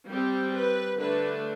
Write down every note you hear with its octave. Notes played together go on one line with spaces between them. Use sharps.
G3 C4 G4
B4
D3 A3 D4 B4